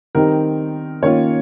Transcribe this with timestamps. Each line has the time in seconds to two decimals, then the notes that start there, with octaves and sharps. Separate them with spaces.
0.15 D#3 G3 C4 D#4 A#4
1.02 D#3 A#3 C#4 F4 C#5